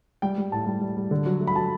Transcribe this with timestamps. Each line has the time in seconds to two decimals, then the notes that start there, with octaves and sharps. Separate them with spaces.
0.22 G3 G5
0.38 G3
0.52 A2 A5
0.67 G3
0.81 G3
0.97 G3
1.11 D3
1.26 F#3
1.40 A3
1.47 B5
1.56 F#3 A5